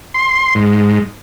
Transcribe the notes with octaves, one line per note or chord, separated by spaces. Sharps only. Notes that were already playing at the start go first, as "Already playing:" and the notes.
C6
G#2